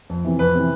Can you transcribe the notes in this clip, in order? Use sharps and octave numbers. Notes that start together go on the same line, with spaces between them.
F2
C3 E3
F2 B4
C3 E3